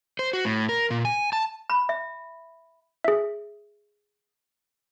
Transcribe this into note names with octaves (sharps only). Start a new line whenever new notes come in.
C5
F#4
A2
A#4
A#2
G#5
A5
B5
E5
G#4 E5